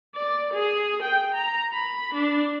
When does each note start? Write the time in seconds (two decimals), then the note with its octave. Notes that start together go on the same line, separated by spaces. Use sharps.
0.15 D5
0.53 G#4
1.02 G5
1.34 A#5
1.74 B5
2.14 D4